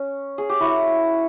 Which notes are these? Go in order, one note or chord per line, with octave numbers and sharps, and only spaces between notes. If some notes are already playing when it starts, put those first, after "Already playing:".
Already playing: C#4
G#4
G4
E4 F#4